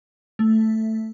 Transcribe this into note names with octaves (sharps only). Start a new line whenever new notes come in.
A3